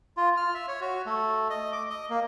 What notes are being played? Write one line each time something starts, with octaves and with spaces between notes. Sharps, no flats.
F4
F6
E5
C#5
F#4
A3
D#5
D6
D#5
A#3